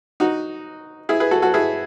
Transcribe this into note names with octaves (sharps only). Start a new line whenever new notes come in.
D#4 F#4
E4 G#4
G#4 B4
F#4 A4
F#4 A4
E4 G#4